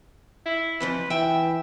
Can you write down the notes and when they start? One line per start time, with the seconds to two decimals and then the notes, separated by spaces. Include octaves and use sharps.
0.46 E4
0.80 F2 E3 F3 B4
1.10 E3 E5 G5